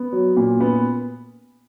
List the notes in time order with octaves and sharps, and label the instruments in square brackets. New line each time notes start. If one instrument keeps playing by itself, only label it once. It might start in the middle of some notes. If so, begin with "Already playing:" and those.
Already playing: [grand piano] B3
F#3
A#2
B3